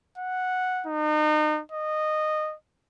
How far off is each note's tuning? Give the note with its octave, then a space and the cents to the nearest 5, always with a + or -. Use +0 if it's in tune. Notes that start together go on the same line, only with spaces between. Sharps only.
F#5 -5
D#4 -35
D#5 -15